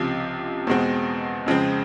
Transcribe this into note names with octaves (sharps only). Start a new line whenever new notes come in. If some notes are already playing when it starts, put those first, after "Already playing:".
Already playing: C#2 C3 F3
E2 B2 G#3 C4
F2 C#3 F3 G#3 C4